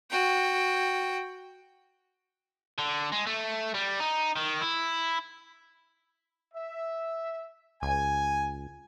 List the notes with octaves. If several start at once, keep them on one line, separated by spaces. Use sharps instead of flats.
F#4 G5
D3
G#3
A3
G3
D#4
D#3
E4
E5
C#2 G#5